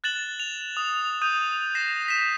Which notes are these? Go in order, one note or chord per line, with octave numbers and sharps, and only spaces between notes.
F#6 A6 E7 F#7 G7
F7
D#6
D#6 G6 D#7
A#6 C7 E7
A#6 B6 E7